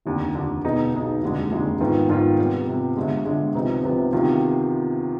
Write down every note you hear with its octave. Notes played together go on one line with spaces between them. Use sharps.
F1 D#2 D3
F1 D#2 D3
B1 B2 B3 D#4 G#4
B1 B2 B3 D#4 G#4
F1 D#2 D3 G#3
F1 D#2 D3 G#3
G#2 D#3 B3 F4
G#2 D#3 B3 F4
C3 G3 B3
C3 G3 B3
G1 G2 D3 G#3
G1 G2 D3 G#3
C2 C3 F3 B3 D#4
C2 C3 F3 B3 D#4
D2 C3 D#3 B3 F4